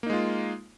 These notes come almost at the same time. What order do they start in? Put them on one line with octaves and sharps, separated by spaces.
A#3 D#4 G#3 F4